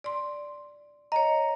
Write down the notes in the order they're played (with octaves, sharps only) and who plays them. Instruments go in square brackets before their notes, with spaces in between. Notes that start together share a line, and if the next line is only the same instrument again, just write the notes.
[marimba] D5 C6
[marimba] C#5 D#5 [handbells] A#5